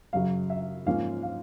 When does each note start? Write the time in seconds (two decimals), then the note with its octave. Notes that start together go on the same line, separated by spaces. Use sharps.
0.13 F#2 C#3 F#3 F5
0.50 E5
0.86 G#2 F3 A#3 C#4 F5
1.23 F5